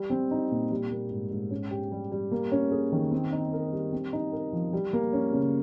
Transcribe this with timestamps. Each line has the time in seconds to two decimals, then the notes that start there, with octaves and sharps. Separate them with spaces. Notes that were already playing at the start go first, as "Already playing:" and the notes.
Already playing: G3
0.10 C4
0.31 D#4
0.51 A#2
0.71 G3
0.91 A#3
1.11 G#2
1.31 G#2
1.51 C#4
1.71 G4
1.92 G3
2.12 G3
2.31 A#3
2.52 C#4
2.71 G#4
2.92 D#3
3.12 C4
3.32 D#4
3.53 A#4
3.73 G3
3.93 C4
4.13 D#4
4.32 A#4
4.53 F3
4.73 G3
4.93 A#3
5.13 C#4
5.33 C#3